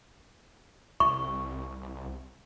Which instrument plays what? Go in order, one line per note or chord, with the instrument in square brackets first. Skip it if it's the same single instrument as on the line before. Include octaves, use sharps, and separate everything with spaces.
[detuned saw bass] C2 [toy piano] C#6